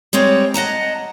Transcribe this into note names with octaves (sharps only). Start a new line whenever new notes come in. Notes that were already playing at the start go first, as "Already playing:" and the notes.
G3 G#3 C4 C#5
D#5 F#5 A5 A#5